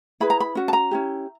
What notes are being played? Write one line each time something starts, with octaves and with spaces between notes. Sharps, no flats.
E4 G#4 B4 B5
A#5
B5
C#4 F#4
A5
A#5
C#4 E4 G4